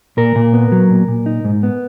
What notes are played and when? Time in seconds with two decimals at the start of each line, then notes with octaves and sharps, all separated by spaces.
0.17 A#2 A#4
0.36 A#2
0.53 B3
0.72 F#3
0.90 A#2
1.08 A#2
1.26 D#4
1.45 G#2
1.63 B3